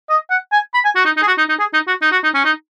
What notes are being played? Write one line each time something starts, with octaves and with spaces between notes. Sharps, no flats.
D#5
F#5
G#5
B5
G#5
F#4
D#4
D#4
G#4
F#4
D#4
D#4
G#4
D#4
F#4
D#4
F#4
D#4
C#4
D#4